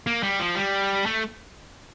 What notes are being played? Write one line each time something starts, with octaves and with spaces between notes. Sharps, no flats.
A#3
G3
F3
G3
A3